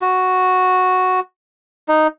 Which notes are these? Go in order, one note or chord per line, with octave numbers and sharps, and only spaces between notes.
F#4
D#4